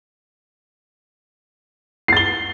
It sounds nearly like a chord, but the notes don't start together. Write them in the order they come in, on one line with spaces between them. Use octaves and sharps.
C7 A6 G7